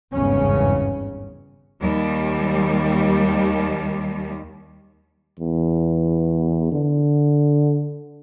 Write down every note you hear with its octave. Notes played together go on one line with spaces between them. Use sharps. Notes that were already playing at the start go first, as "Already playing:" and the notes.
G#1 E2 G2 C#3 C#4
D#2 G3
E2
D3